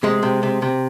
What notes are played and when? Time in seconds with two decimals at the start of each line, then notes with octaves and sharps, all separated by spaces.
0.03 C3 G#3
0.23 C3
0.43 C3
0.62 C3